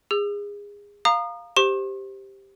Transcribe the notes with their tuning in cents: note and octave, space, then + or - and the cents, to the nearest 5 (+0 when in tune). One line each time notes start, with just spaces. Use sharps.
G#4 -25 E6 +20
F5 +0 A#5 +0 D#6 -30
G4 +0 C5 +0 C6 +45